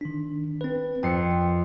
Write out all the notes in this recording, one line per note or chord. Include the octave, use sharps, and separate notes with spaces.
D#3 D4
C4 B4
F2 G5 C7 C#7